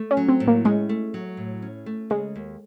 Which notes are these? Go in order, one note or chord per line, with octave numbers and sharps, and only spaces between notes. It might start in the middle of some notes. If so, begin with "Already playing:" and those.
Already playing: A3
C#4
F#3
C4
A2
A#3
G#3 C#4
A3
F#3
A2
C#4
A3
C#3 G#3
D#2